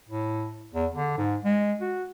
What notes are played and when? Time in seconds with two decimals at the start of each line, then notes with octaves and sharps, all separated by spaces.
0.09 A2
0.74 E2
0.95 D3
1.18 G#2
1.44 G#3
1.81 F#4